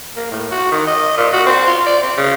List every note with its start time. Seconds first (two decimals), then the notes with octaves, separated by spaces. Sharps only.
0.16 A#3
0.31 A2
0.51 F#4
0.71 D#3
0.87 D#5
1.17 A#2
1.33 F#4
1.46 C4
1.66 F4
1.86 D5
2.02 C4
2.17 C#3